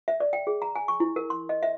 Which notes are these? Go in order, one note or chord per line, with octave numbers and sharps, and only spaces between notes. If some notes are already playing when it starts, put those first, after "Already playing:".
E5
D5
G5
G#4
A#5
G#5
C#6
E4
A#4
C6
D#5
E5